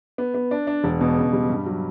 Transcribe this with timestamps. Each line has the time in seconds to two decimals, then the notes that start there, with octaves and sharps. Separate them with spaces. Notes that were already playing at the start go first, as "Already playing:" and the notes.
0.18 B3
0.34 B3
0.51 D4
0.67 D4
0.84 E1
1.01 B2
1.16 C#3
1.33 G3
1.50 G2
1.66 F#3